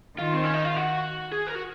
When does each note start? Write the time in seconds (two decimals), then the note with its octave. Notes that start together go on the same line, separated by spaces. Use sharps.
0.18 D#3 F4
0.34 C4
0.44 C#4
0.54 D#4
0.65 F4
0.77 F#4
1.32 G#4
1.47 A#4
1.55 F#4